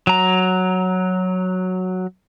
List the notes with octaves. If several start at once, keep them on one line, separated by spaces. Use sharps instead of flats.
F#3 A#5